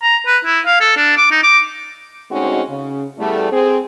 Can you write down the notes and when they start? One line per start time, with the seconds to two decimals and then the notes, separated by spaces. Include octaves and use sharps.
0.02 A#5
0.27 B4
0.45 E4
0.66 F5
0.80 A4
0.97 D4
1.17 D6
1.31 D#4
1.43 D6
2.30 D2 G#3 C4 C#4 D#4 F#4
2.68 C#3
3.18 E2 G3 A3
3.52 C4 G#4